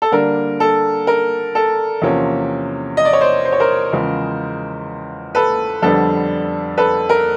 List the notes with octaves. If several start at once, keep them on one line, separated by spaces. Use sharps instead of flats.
A4
D3 G3 A#3 D4 A#4
A4
A#4
A4
E2 C3 F3 A#3 C#4
D#5
D5
C#5
C5 D5
C5
C#5
A#4 C5
E2 C#3 F3 G#3
A4 B4
F2 D3 G3 B3 D4 A4
A4 B4
A#4